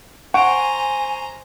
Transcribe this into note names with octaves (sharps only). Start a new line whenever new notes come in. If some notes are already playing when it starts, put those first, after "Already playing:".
C5 F#5 G#5 A#5 C#6 D7